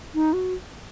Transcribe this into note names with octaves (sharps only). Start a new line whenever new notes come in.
D#4
F#4